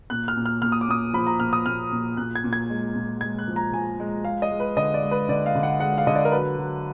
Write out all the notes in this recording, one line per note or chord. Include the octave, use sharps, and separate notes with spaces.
A#2 F#6
F6
A#2
F6
A#2 F6
D#6
D6
A#2 D#6
F3 B5
A#5
A#2 F6
D#6
A#2 F6
A#2
A#2 F#6
G#6
A#2
G#6
G#3
A#2
G#3 G#6
F#6
F3
A#5
F3 G#5
G#3
G#3 F5
D#5
G#3
B4
D3 D#5
D5
G#3
B4
D3 D5
F5
D3
F#5
G#3 F#5
F5
D3 D#5
D5
A#4
F#3 B4
F#3